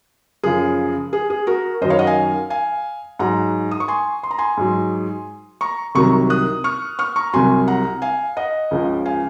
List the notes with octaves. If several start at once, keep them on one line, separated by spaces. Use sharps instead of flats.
F#2 C#3 F3 G#4
G#4
G#4
F#4 A#4
F#2 D#3 F#3 C5 D#5
C#5 F5
D#5 F#5
F5 G#5
F5 G#5
G#2 F#3 F#5 A#5
D#6
C#6
G#5 C6
C6
A#5
G#5 C6
G#2 F#3
A#5 C#6
C2 C3 D#3 F#3 A#5 C#6
D#6 F#6
C#6 F6
C#6 F6
A#5 C#6
C2 C3 F#3 G#5 C6
F#5 A#5
F5 G#5
D#5 F#5
C#2 C#3 F3
F5 G#5